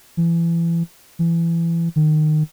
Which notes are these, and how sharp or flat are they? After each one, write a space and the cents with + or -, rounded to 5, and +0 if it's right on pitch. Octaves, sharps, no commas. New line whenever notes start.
E3 +30
E3 +25
D#3 -20